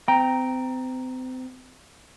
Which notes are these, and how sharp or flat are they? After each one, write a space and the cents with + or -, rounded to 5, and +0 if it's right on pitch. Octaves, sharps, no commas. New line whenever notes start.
C4 -35 G5 +0 A#5 +0